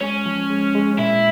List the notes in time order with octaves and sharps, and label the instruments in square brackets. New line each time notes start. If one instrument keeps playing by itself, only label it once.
[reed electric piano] G#3 [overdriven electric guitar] C#4
[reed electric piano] F3
G#3
G#3
[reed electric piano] A#2 [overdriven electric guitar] E4